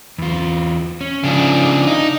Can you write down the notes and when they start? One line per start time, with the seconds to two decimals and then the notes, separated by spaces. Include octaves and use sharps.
0.18 E2 F4
1.01 C#4
1.24 C#3 F3 D4
1.87 D#4